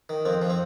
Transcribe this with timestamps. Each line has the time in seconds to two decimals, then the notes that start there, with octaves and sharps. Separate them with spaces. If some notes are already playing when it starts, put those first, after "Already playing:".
0.09 D#3
0.25 F2 C4
0.42 F3
0.50 C4